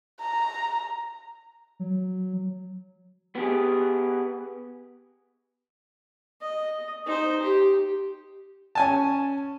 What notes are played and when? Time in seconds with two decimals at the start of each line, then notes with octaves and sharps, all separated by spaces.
0.20 A#5
1.80 F#3
3.35 B3 G4 G#4
6.41 D#5
7.06 D#4 C5
7.43 G4
8.75 C#4 G#5 A5